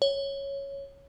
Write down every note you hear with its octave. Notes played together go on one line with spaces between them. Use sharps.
C#5